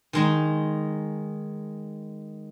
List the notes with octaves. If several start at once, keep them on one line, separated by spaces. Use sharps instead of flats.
D#3 G#3 D#4